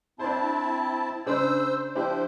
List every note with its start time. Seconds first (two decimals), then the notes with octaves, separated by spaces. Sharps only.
0.19 C4 D4 E4 C5 A5
1.26 C#3 D4 C5 E6
1.95 F3 D4 E4 G4 C5